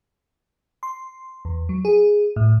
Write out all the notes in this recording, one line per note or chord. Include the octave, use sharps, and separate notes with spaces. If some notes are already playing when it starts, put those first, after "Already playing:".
C6
E2
F#3
G#4
A2